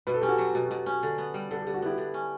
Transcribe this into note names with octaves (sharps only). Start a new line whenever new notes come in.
B2 B4
A4
C#4 G4
F#4 A4
F#3
B2
B2
C#4
D3
B3
G3
D3 A4
D3 G4
F#4
B3 E4 G4
D3
C#4